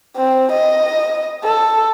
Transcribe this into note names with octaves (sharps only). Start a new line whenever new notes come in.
C4
D#5
A4